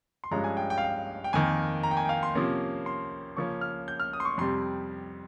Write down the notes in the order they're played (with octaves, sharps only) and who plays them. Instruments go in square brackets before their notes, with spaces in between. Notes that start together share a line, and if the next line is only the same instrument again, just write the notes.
[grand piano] C6
G2 F3 G#3 C#4 A#5
G#5
G5
G5
F5
G5
G5
F2 D#3 A#3 G#5
A#5
G5
G#5
G5
F5
C6
C3 F3 A#3 C#4
C6
C#3 F3 A#3 C#4 C#6
F6
G6
F6
D#6
C6
C#6
F2 C3 G3 C6